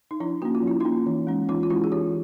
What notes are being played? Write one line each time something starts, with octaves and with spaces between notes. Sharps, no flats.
D#4
F3 D4 E4
A#3 C#4 F#4
F4
F3 E4
A#3 C#4 D#4 F4
E3
G#3 C#4
E3 D#4 F4
F4
G#3 C#4 E4 F#4
G#4
E3 F4 G4